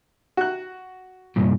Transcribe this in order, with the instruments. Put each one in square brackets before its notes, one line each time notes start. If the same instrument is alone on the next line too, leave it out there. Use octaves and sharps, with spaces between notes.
[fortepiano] F#4 F#6
[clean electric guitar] C2 G2 A#2